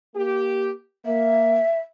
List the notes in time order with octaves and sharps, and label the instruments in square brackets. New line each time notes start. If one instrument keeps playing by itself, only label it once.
[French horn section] A#3 G4
[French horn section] A#3 [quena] E5